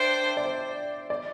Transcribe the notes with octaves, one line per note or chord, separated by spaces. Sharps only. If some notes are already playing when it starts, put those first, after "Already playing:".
Already playing: D4 C5 E5 G5
D5
C5
D5